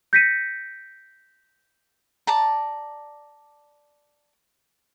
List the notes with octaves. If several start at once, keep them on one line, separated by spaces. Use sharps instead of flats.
G6 A#6 B6 C#7 D#7
D5 A5 A#5